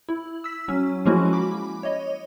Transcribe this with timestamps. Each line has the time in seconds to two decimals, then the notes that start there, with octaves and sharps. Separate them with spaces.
0.09 E4
0.44 E6 B6
0.68 F#3 C#4
1.05 F3 G#3 A#3 C#4 E4 F#4
1.33 B5 D6
1.83 C#5 D#5